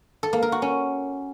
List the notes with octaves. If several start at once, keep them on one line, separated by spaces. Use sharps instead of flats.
A4
A#3
A#4
F#4
C#4